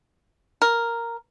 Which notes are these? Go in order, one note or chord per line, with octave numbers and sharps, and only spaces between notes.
A#4